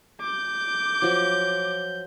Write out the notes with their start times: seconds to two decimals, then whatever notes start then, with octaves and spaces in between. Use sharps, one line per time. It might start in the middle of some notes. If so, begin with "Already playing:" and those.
0.21 D6 G6
1.02 F3 F#3